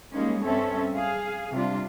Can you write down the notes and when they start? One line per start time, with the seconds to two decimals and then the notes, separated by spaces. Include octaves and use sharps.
0.13 G3 G#3 A#3 C#4 D#4
0.44 G2 C4 C#4 A4 C#5 E5
0.94 G#4 F5
1.52 C3 G3 D4 F4